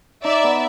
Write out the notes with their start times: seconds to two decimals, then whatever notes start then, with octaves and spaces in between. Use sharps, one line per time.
0.24 D#4 D5 E5
0.44 B3